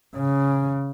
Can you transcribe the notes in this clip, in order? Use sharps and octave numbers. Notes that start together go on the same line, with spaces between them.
C#3